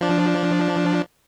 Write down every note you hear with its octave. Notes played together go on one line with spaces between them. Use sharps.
F3 D4